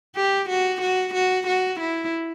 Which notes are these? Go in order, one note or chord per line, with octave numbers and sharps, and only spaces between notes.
G4
F#4
F#4
F#4
F#4
E4